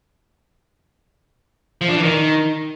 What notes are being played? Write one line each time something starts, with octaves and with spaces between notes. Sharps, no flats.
F3
D4
E3
D#3